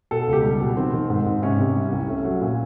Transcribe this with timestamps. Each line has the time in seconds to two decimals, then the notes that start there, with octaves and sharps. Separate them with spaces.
0.11 B2 A4
0.28 C#2
0.33 G4
0.44 G3
0.60 B2
0.77 D#3 C4
0.93 D#3
1.10 G#2
1.26 G#2
1.42 C3 C#4
1.59 C3
1.76 G3
1.92 C2
2.08 A3 C#4
2.25 F#3
2.41 A#2